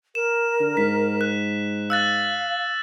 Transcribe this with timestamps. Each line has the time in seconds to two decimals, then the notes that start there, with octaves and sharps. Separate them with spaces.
0.15 A#4 E7
0.60 D3
0.77 G#2 B6
1.21 F#6
1.90 F5 E6 F#6 A6